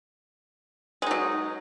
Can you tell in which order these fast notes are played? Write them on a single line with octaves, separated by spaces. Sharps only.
G#3 D#4 F#3